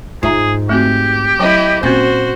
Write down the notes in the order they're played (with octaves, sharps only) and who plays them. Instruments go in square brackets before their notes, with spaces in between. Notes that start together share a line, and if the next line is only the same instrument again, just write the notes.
[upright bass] G#2 [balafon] F4 E5 A#5 [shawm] G#4
[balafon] A3 C4 F#4 [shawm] G4
[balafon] F#3 G5 [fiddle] E4 D#5
[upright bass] A#2 [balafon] C4 C#4 [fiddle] F#4 C5